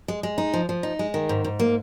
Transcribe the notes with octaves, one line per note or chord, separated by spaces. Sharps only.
G#3
G#3
D#4
F3
F3
D#4
G#3
D#3
G#2
G#2
A#3